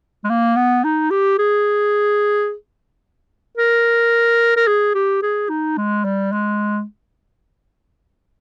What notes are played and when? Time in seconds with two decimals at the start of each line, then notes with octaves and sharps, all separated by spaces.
0.24 G#3
0.30 A#3
0.56 B3
0.84 D#4
1.11 G4
1.39 G#4
3.57 A#4
4.56 A#4
4.67 G#4
4.95 G4
5.23 G#4
5.49 D#4
5.77 G#3
6.05 G3
6.32 G#3